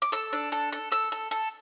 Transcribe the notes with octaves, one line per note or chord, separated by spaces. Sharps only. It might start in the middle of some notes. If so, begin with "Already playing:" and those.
D6
A4 E6
D4
A4
A4
A4 E6
A4
A4